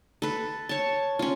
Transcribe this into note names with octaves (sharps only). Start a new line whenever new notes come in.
A4 B4
C#5 A5
C#4 F4